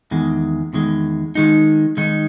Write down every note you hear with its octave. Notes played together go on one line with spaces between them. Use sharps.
E2 D#3 G#3
E2 D#3 G#3
D#3 G#3 D#4
D#3 G#3 D#4